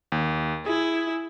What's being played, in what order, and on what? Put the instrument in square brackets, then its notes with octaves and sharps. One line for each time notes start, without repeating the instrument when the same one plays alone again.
[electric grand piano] D#2
[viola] E4 [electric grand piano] G#4